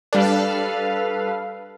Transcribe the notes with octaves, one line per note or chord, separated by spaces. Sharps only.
G3 D4 A4 B4 F5